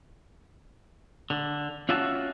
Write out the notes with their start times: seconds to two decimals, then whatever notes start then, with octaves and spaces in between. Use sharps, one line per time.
1.30 D3
1.89 C#4 F4 F#4 E5 F#5 A5